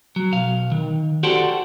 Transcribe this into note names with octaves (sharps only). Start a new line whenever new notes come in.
F#3
B1 F5
D#3
F#4 G4 A4 C5 D5 F#5